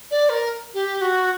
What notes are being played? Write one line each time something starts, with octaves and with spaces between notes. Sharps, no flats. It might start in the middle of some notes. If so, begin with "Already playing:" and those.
D5
A#4
G4
F#4